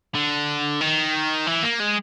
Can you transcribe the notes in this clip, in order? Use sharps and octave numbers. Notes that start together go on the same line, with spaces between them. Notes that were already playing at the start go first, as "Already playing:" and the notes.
D3
D#3
E3
A#3
G#3